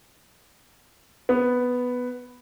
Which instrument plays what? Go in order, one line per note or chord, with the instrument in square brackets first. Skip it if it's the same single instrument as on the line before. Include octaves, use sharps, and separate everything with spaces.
[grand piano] B3